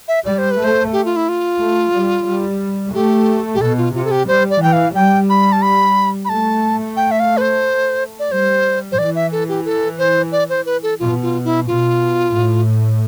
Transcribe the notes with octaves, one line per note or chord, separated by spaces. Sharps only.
E5
G3 D5
C5
B4
A3 C5
G4
F4
E4
F4
A3
G3
G3
A3 G4
G4
B2 A4
F4
C3 F4
A4
G4
G3 C5
D5
E3 G5
F5
G3 G5
B5
A5
B5
B5
A3 A5
G5
E5
F5
B4
C5
D5
G3 C5
C5
E3 D5
E5
A4
G4
A4
C5
D5
C5
B4
A4
B2 F4
F4
E4
B2 F4
A2